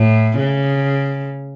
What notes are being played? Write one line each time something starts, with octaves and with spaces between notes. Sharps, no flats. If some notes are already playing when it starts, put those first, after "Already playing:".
Already playing: A2
C#3